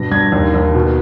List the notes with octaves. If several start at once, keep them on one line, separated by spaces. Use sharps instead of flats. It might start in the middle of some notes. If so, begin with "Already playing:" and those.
Already playing: G2 B2 A#6
G2 G#6
D#2
D#2
B2